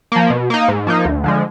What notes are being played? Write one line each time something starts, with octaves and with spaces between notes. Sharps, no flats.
F3 A#3
B2
A#3 D#4
G#2
F3 A#3 D#4
D2
D3 F3 G#3